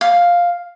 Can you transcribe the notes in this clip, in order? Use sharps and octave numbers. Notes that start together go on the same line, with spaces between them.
F5